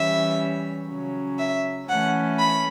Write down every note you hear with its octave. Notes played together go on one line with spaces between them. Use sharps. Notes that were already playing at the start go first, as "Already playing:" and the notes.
Already playing: E3 G3 C#4 E5
C#3 F#3 C#4
E5
E3 A3 C#4 F#5
B5